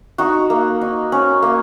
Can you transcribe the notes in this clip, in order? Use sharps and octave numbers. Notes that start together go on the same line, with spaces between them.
D#4 F#4
A#3
D#4
C#4
A#3